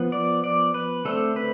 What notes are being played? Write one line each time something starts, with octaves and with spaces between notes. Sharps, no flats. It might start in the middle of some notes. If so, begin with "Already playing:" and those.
Already playing: F3 B3
D5
D5
B4
D3 A3 C4 A4
B4